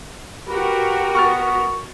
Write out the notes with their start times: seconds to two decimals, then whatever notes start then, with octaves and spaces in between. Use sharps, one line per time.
0.48 F#4 G4 A#4 B4
1.15 B3 C#6 F6 A6